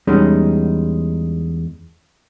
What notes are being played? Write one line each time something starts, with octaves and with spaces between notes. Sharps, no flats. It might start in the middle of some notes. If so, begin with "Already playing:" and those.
E2 G3 G#3 C#4 D#4